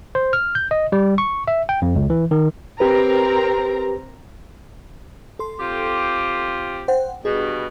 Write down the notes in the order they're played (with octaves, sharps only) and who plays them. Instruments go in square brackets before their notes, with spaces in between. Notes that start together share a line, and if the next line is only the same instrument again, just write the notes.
[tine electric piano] C5
F6
G6
D#5
G3
C#6
E5
G5
F2
C#2
E3
D#3
[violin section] C4 A#4 A#5 [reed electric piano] G4 B4
[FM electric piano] A4 C6
[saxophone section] C4 F4 G4
[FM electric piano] C5 F#5 G5
[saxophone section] G2 B2 [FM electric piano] G#4